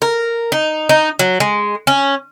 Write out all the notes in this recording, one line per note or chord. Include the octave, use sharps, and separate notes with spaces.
A#4
D#4
D#4
F#3
G#3
C#4